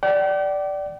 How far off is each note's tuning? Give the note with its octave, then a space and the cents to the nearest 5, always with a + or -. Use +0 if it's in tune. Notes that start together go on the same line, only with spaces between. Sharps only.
D5 +0 G5 -45